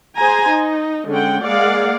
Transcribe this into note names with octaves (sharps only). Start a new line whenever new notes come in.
G#4 C5 G#5 A#5
D#4
D3 G#3 C#4 F#5 G5
G#3 A#3 G#4 D5 F5 F#5